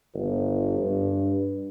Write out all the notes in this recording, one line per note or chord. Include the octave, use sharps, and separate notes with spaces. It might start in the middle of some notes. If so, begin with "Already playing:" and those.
G1
G2